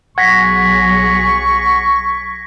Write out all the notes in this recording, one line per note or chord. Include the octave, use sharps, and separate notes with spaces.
B1 F#3 G#4 F#5 C#6 G#6 A#6 B6